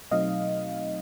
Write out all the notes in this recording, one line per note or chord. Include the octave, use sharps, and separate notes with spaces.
B2 F#3 A3 C4 D#4 D#5 F5